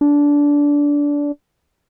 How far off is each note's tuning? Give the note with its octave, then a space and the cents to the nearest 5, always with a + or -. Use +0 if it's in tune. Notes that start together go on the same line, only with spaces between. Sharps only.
D4 -20